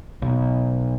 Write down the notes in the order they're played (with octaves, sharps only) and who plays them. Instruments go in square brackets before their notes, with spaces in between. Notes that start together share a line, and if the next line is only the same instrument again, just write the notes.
[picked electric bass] B1